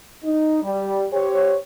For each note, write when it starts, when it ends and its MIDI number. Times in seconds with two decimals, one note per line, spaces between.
0.24 0.63 63
0.63 1.06 55
1.13 1.56 67
1.13 1.56 72
1.13 1.56 73